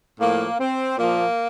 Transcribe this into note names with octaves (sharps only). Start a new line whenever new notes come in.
A2 F3 A#3
C4
A#2 F3 A#3